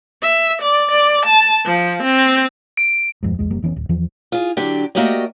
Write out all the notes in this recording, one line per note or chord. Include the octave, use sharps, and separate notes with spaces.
E5
D5
D5
A5
F3
C4
D7
D#1 F2 G#2
A#1 E2 G#3
F#1 G3 A#3
F1 E3 B3 C#4
D1
E2 E3 F3
F4 G#4
D3 F#3 D4 G4
A3 A#3 F#4 G4 D5 D#5